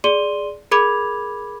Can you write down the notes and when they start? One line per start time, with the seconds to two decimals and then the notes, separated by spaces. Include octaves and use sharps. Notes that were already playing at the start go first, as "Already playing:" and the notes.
0.04 G#4 D5 C6 D#7 G7
0.71 G#4 A#4 B5 D6 G#6 F7